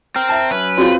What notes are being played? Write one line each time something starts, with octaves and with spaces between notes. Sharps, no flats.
C4 A#4
E5 A5
F#3 C#4 B4
C4 F4 F#4 G#4 C#5